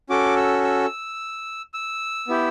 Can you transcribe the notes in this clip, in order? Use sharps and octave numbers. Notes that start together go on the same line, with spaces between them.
C#4 F#4 A4 D6
E6
E6
E6
B3 E4 G4